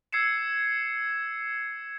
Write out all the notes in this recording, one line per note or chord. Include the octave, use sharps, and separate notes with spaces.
E6 G#6 C7 C#7 E7